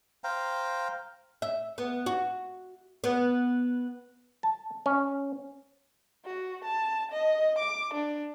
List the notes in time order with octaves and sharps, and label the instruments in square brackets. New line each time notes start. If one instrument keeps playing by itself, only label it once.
[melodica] C5 F5 G5 A#5
[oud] E5
B3
F#4
B3
[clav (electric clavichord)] A5
C#4
[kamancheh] F#4
A5
D#5
D6
D4